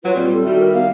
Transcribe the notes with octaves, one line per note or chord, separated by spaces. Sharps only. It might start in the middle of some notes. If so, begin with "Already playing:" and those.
F#3 F4 B4
A#2 G3 C4
A4
D#3 G3 E4 F#4
A#4
B3 F5